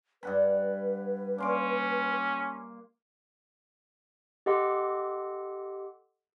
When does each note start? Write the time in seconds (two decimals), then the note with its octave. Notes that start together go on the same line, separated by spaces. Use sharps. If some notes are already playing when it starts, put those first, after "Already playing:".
0.23 G2 B4 F#5 B5
1.38 A#3 C#4 C6 D6
4.46 G4 A4 D#5 F#5 C6 D6